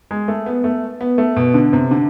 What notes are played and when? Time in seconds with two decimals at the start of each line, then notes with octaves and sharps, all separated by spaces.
0.11 G#3
0.28 A3
0.46 B3
0.64 A3
1.01 B3
1.18 A3
1.36 B2
1.54 D3
1.73 C3
1.91 D3